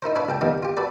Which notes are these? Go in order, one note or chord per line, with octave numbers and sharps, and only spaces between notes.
D#4 E4 A#4 C5
D4 E4 B4 C#5 F5
C#2 A4 G5
F2 D#3 G3 A#3 B3
F4 G4
F#4 A4 B4 D5